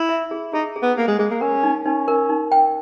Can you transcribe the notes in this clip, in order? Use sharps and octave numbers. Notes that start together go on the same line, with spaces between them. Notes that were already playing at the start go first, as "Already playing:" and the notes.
Already playing: E4
E5
G#4
D#4 G#4
G#4
B3
A#3 G#4
G#3
G#3 G#4
A#3
C#4 A#4
D#4
C#4 D#4
A#4
D#4
G5